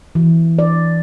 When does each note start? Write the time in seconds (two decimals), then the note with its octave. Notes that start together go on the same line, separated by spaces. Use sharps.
0.15 E3
0.59 D5